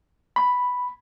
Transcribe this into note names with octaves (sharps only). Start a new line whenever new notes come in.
B5